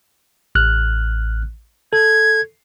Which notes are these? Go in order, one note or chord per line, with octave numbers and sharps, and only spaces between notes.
A1 F6 F#6
A4 G#6